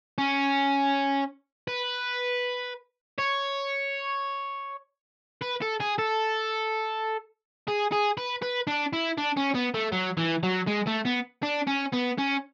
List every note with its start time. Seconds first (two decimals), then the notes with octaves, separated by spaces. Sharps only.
0.18 C#4
1.68 B4
3.18 C#5
5.42 B4
5.62 A4
5.80 G#4
5.98 A4
7.68 G#4
7.92 G#4
8.17 B4
8.42 B4
8.67 D4
8.93 E4
9.18 D4
9.37 C#4
9.55 B3
9.74 A3
9.92 F#3
10.17 E3
10.43 F#3
10.67 G#3
10.87 A3
11.05 B3
11.43 D4
11.67 C#4
11.93 B3
12.18 C#4